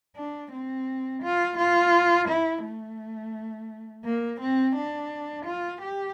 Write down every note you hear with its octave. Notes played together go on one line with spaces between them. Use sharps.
D4
C4
F4
F4
E4
A3
A#3
C4
D4
F4
G4